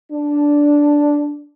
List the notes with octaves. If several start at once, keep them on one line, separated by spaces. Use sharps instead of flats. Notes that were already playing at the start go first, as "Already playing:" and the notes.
D4